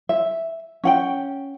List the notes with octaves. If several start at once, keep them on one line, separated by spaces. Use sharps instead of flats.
E5
C#4 F#5 G5